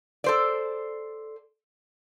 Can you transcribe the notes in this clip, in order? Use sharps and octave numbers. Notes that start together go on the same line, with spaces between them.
A4 C5 D5